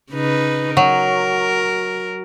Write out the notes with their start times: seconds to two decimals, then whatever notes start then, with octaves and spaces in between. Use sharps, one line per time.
0.12 C#3 D#4 B4
0.77 F#3 A#4